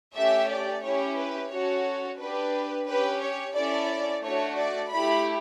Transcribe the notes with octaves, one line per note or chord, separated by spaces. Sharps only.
A3 C#4 G4 E5
D5
C#4 E4 G4 C#5
B4
C#4 F#4 A4 C#5
D4 G4 B4
C#4 G4 B4
C#5
C#4 E4 A4 D5
A3 D4 F#4 C#5
D5
A3 E4 G4 B5